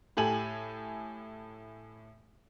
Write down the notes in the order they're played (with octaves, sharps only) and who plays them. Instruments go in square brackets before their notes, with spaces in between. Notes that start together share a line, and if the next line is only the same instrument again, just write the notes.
[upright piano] A2 G4 A4 G#5 F#7